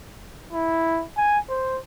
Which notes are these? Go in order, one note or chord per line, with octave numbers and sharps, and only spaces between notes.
E4
G#5
C5